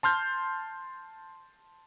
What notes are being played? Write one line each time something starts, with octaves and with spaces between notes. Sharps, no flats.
A5 C6 F6 G6